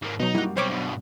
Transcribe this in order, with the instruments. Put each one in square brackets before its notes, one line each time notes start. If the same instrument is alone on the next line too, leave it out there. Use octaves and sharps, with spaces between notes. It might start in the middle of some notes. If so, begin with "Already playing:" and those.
[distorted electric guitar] G#2 A#3
[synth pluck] B2 F#3 [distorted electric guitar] D#4
[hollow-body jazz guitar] F#2 G3 A#3 [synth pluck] E4 F#4
[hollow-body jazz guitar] B1 [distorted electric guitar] G3 C4 [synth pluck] C5 C#5 D6
[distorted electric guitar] G2 B2